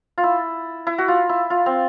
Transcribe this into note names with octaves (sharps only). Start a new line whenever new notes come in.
F4
E4
E4
F#4
F4
E4
F4
C4